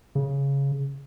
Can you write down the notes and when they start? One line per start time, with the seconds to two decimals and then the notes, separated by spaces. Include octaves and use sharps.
0.15 C#3